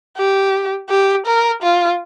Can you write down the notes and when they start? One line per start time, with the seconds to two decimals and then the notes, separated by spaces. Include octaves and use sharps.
0.18 G4
0.90 G4
1.26 A#4
1.63 F4